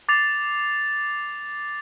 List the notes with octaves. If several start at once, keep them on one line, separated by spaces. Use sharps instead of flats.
D6 A6 C7 F7